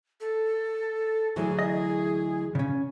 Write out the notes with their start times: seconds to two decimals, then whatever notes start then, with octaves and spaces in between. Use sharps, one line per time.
0.21 A4
1.36 D2 E3 F#3 G#4
1.59 D#5
2.55 C#3 C#4